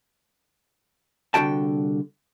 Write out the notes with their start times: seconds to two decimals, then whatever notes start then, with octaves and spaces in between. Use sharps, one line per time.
1.34 C2 D3 A#3 F#4 G5 A5